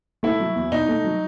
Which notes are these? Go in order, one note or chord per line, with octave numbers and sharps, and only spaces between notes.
A3 E4
F#3
E2
B2 D#4
A3
F#3